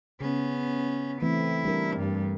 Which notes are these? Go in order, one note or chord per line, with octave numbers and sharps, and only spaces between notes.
C#3 B3 C#4
E3 A3 C4 E4
G3 D4 A#4
G2